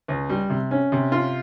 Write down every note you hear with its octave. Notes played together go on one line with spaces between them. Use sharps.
C#2
G3
C3
C#4
C3
F4